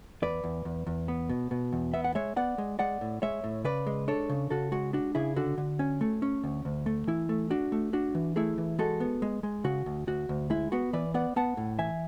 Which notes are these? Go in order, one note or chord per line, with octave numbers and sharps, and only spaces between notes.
E2 B4 D5
E2
E2
E2
B3
B2
B2
E2
B3 E5
F#5
G#3 C#5 E5
B3 D5 F#5
G#3
G#3 D5 F#5
A2
G#3 C#5 E5
A2
C#3 B4 D5
G#3
D4 A4 C#5
C#3
C#3 F#4 A4
G#3 F#4
D4 F#4
C#3 E4 G#4
D3 F#4
D3
C#4
A3
C#4
D2
D2
A3
E3 E4
A3
D4 F#4
A3
D4 F#4
E3
A3 E4 G#4
E3
G#3 F#4 A4
B3
G#3
G#3
C#3 F#4
D2
D2 F#4
D2
G#3 E4
B3 F#4
E3 B4 D5
B3 D5 F#5
B3 F#5 A5
A2
E3 E5 G#5